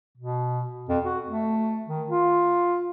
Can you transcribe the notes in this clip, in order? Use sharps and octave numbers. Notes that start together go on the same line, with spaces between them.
B2
F2
F#4
A3
D#3
F4